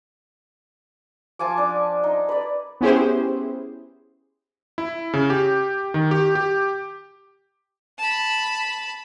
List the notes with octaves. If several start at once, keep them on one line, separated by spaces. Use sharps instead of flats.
F3 G#5 A5 D6
D4
D#4
B4 D5
B3 C#4 E4 G4 G#4 C5
E4
C#3
G4
D#3
G4
G4
A5 B5